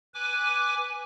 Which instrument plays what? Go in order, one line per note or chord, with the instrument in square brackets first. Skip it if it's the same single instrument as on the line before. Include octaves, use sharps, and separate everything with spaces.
[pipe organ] B4 G#5 D6